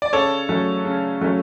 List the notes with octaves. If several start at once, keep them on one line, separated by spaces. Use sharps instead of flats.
D5
C#3 A4 C#5
F#3 A3 C#4
C#3
F#3 A3 C#4